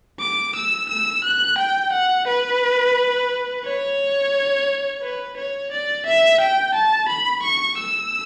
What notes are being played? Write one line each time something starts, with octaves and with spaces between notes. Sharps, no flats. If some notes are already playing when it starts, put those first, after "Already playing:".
D6
E6
E6
F#6
G5
F#5
B4
C#5
B4
C#5
D5
E5
G5
A5
B5
C#6
E6